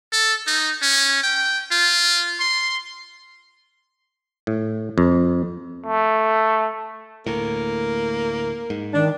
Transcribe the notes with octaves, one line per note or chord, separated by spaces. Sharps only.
A4
D#4
C#4
G5
F4
C6
A2
F2
A3
D2 A2 A#3
G#2
D#3 D4